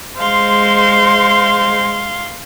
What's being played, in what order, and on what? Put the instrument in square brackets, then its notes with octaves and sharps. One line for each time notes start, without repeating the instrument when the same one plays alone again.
[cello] G#3 C5 [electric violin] F5 C6